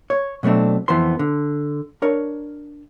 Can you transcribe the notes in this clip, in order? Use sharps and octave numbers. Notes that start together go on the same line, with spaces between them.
C#5
B2 F#3 A3 C4 D4
F2 E3 B3 C5 C6
D3
D4 A#4 C#5